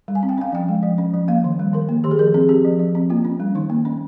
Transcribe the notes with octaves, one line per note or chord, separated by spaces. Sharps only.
G3
G#5
C4
G5
C#4 F5
F3 G5
G#3
F3
C#4
F3
A#3 F5
D#3
G3
D#3 A#4
A#3
D#3 G4
G#4
F3 A#4
C4 G#4
C4 G4
F3
F3
C4
A#3 F4
C#4
G3
D#3 D#4
A#3
C#4